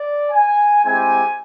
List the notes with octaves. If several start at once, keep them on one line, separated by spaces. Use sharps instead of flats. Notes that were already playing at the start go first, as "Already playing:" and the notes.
Already playing: D5
G#5
G#3 C4 E4 G4 G#5